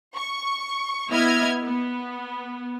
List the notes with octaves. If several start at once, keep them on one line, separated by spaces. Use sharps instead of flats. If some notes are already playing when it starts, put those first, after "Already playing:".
C#6
B3 E4 D#5 F6 G#6
B3